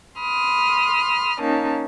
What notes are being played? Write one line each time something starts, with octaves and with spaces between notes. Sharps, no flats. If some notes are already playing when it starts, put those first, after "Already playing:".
B5 C6 D#6 F6
A#3 C#4 D#4 A5